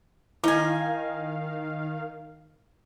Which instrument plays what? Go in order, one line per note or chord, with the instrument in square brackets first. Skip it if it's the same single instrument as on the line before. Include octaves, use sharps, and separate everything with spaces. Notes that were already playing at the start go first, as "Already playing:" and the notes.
[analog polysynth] D#3 F5 [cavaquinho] D#4 G#5 [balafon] E4